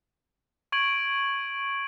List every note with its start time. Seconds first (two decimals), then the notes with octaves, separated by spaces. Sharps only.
0.72 C#6 G#6 D7 F#7